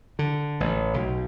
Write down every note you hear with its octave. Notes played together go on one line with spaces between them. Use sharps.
D3
A1
B1